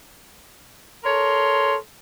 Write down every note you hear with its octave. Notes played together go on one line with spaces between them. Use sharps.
A4 A#4 C#5 C6